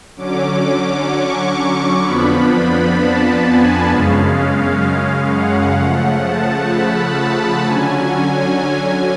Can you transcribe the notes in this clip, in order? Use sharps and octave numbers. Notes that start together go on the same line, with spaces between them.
D3 F#3 C#4 D6
D6
C#6
F2 F3 B3 D4 B5
A5
G#5
F#2 C#3 G#3 C#4 F5
F#5
C#3 F3 A3 F#5
A5
B5
A5
D3 F#3 C#4 G#5